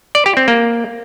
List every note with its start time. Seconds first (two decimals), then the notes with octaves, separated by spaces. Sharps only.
0.15 D5
0.26 G4
0.37 C4
0.48 A#3